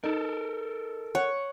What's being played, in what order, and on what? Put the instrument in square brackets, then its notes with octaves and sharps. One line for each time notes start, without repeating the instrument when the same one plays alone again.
[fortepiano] D#4 [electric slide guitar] A4 A#4
[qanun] C#5 [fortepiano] F#5